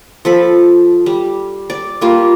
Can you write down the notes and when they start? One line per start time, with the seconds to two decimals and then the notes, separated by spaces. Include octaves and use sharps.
0.25 F3 A4 B5
1.06 G3
1.70 D5
2.01 G3 A#3 F4